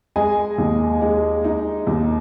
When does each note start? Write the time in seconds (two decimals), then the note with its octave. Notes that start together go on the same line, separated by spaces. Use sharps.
0.16 G#3 D#5 G#5
0.58 D#2
1.01 G#3
1.44 D#4
1.87 D#2